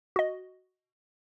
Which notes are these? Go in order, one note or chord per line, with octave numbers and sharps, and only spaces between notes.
F#4 D#5